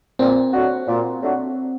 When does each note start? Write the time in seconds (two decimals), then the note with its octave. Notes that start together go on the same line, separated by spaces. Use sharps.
0.19 A#2 C4
0.54 F#3 A3 D4 F#4
0.87 A#2
1.21 F#3 A3 D4 F#4